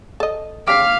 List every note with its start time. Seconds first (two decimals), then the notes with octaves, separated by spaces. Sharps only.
0.20 A4 D#5
0.67 C#3 G4 F5 D6 F6 B6